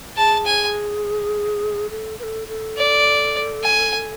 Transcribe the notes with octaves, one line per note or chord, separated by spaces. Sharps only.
G#4 A5
G#5
A4
B4
A4
A4
D5
G#5